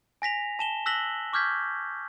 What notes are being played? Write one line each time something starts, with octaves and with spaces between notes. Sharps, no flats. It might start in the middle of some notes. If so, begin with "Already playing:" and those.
G#5 A#6 B6 F7
A5 E7 G7
E6 F#6 A#6 B6 F#7 G7
C#6 D6 F6 G6 G#6 B6